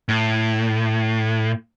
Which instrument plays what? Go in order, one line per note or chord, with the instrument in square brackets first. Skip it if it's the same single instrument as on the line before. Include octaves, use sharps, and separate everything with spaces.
[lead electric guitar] A2